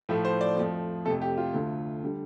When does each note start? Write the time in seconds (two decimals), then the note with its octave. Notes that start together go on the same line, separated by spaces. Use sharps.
0.09 A2 F3 A3
0.25 C5
0.41 D5
0.56 F2 F3 A3
1.05 F2 C3 A3 A4
1.22 G4
1.38 F4
1.54 D2 D3 A3
2.04 D3 G3